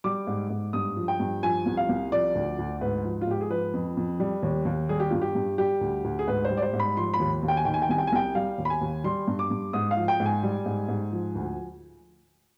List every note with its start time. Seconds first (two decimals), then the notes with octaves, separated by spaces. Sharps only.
0.04 G3 D6
0.27 G#2
0.50 G#2
0.73 G2 D#6
0.97 F3
1.08 G5
1.20 G2
1.43 F3 G#5
1.66 C2
1.77 F5
1.89 C2
2.12 F3 D5
2.35 D2
2.59 D2
2.81 G#2 B4
3.04 F3
3.21 F4
3.27 G#2 G4
3.41 G#4
3.50 F3 B4
3.74 F2
3.97 F2
4.20 G3
4.43 D#2
4.65 D#2
4.89 G3 G#4
5.00 G4
5.10 G2 F4
5.21 G4
5.35 G2
5.58 G3 G4
5.81 D2
6.04 D2
6.19 G#4
6.27 G#2 B4
6.45 C5
6.51 G3
6.57 D5
6.62 C5
6.73 G#2
6.80 B5
6.97 F3 C6
7.14 B5
7.20 D#2
7.43 D#2
7.48 G5
7.57 G#5
7.65 D#3 G5
7.74 G#5
7.82 G5
7.89 C2 G#5
7.98 G5
8.07 G#5
8.12 C2 G5
8.35 G3 F5
8.58 D#2
8.65 B5
8.70 G#5
8.81 D#2
9.04 G3 C6
9.28 G2
9.39 D6
9.50 G2
9.73 G#2 D#6
9.91 F5
9.97 F3
10.08 G5
10.20 G#2
10.26 G#5
10.43 G3
10.66 G#2
10.88 G#2
11.12 F3
11.35 D2